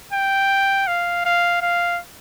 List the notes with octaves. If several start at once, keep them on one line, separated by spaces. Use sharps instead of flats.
G5
F5
F5
F5